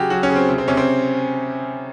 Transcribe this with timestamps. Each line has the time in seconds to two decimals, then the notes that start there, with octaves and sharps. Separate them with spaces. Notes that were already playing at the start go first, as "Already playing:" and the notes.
Already playing: C#3 F#3 F#4 G4
0.10 F#3 F#4
0.23 C#4
0.29 C#3
0.36 C4
0.49 C3
0.58 C4
0.68 C3 C#4
0.77 C4